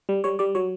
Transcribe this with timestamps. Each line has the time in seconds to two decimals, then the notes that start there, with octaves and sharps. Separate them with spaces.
0.09 G3
0.24 G3 C#5
0.39 G3 D5
0.55 F#3 C#5